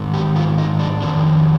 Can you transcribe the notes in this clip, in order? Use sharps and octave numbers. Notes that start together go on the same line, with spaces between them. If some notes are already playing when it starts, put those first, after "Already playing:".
Already playing: G#2 D#3
G4
F4
D#4
D4
F2 D#3 D4